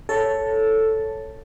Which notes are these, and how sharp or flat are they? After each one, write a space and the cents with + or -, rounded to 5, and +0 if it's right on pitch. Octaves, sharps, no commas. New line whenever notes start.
A4 +0 C#5 +5